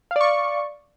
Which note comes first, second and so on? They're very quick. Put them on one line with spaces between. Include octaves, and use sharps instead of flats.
F5 D5 C#6